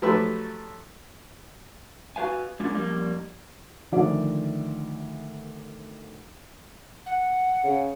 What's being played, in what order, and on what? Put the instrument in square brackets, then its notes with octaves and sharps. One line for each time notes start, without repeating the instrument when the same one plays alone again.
[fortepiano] F3 F#3 A3 G4 B4 E5
[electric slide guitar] F#4 B4 F5 G#5
F#3 G#3 A#3 C#4 D4 F4
F2 G3 A#3
[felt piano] D2 D#3 F3 D5 E5
[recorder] F#5
[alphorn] C#3